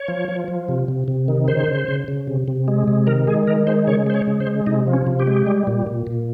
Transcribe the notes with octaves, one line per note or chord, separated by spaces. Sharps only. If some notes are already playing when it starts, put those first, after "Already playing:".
Already playing: C#5
F3
F3
F3
C3
C3
C3
D#3
C#3 C5
C#3
C#3
C#3
C3
C3
G#3
C3
D#3 A#4
G#3 G#4
D#3 A#4
G#3 C5
C#3 C#5
G#3 C5
C#5
C#3
C5
G#3
C3 D#4
F3
C#4
C3
G4
G#3
G3
A#2
A#2
A#2